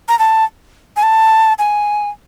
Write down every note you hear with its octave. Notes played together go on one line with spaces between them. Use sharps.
A#5
A5
G#5
A5
G#5